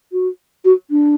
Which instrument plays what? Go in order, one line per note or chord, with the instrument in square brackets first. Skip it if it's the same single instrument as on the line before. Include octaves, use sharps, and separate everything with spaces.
[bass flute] F#4
F#4
D4